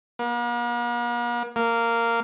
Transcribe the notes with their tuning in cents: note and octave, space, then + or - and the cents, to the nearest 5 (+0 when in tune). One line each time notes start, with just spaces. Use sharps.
A#3 +45
A#3 -10